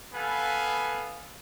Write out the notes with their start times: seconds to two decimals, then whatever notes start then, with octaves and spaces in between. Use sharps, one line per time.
0.13 B3 A4 B4 F5 G#5